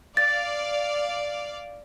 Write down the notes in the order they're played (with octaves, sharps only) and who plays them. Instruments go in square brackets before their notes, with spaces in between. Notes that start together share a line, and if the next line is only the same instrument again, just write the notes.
[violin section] D5 F5 [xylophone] A6